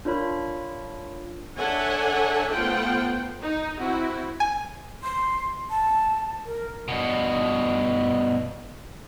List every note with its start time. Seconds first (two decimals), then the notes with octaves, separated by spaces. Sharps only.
0.05 D4 F4 A#4 C#5 B5
1.57 D4 A4 C#5 E5 F#5 G#5
2.51 A3 B3 F4 C5 F#5 G5
3.41 D#4
3.79 C4 E4 F#4
4.40 G#5
5.03 C6
5.70 A5
6.46 A#4
6.88 G2 B2